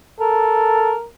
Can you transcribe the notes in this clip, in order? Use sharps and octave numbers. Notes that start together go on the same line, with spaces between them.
A4 A#4